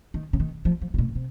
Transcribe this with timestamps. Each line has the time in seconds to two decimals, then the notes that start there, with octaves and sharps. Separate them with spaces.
0.14 D#3
0.33 C#3
0.40 D#3
0.65 F3
0.82 F3
0.94 C3
0.98 A#2
1.09 A#2
1.15 C3